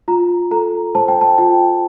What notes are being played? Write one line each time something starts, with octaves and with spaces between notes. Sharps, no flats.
F4 A#5
A4 A#5
C5 A5
G5
A5
F4 G5